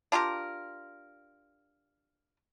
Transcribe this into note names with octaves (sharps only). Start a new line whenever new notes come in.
D4 F4 G4 A#4